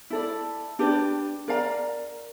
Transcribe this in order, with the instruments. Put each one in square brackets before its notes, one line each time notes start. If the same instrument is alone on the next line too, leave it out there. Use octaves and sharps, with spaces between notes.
[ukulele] E4 A4 D5
D4 G4 B4 D5
A#4 D5 F5 A#5